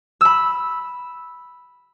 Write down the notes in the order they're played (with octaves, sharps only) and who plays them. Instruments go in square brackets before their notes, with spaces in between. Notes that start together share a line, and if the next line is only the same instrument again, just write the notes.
[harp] B5 E6